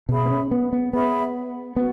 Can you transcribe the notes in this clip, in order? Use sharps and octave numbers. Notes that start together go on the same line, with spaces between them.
B2 G#4 C#5 E5 B5
B3
C#4
B3
B3
B3 G#4 C#5 E5 B5
B3 F#4